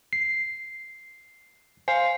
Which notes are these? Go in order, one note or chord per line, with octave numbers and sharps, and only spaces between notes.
C7
C5 F5 G#5 C7